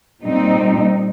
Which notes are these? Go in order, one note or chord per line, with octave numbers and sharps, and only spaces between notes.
A#2 G3 C4 D#4